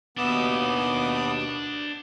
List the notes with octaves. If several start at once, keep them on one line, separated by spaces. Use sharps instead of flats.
D#2 B2 B3 D4 E5 D6 D#6